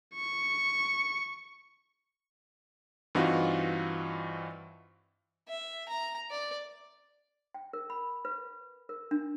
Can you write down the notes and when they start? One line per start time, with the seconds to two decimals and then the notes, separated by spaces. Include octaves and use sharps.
0.15 C#6
3.15 G2 E3 C4 D#4 F4 F#4
5.48 E5
5.89 A#5
6.31 D5
7.54 G5
7.73 A#4
7.90 B5
8.25 B4
8.89 A#4
9.11 D4